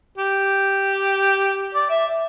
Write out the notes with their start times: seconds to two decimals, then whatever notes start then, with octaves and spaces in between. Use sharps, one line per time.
0.18 G4
1.74 D5
1.90 E5